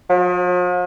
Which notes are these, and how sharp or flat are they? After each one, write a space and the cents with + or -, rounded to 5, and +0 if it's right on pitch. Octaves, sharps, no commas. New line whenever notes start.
F3 +45